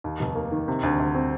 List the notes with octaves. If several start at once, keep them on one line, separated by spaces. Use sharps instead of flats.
D#2
F1
A#3
D#3
C3
D2
D2
C4